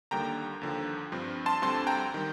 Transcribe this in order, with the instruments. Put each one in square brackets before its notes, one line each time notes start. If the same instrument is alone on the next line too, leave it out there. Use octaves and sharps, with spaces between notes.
[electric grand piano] D#2 D3 G3 A#3 G5 A#5
D#2 D3 F3
G2 F3 C4
A5 C6
D2 D3 G3 C4 A5 C6
G5 A#5
D#3 G3